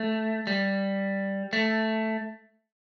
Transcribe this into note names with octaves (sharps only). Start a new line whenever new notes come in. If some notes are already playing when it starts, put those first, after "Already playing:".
Already playing: A3
G3
A3